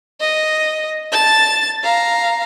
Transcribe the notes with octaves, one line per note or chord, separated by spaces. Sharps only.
D#5
A5 A6
F5 A#5